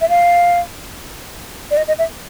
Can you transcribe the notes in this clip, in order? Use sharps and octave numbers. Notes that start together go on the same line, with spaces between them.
E5
F5
D5
D#5
D#5
E5